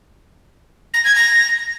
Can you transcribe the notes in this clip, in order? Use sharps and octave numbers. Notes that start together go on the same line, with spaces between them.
A#6
G#6
A#6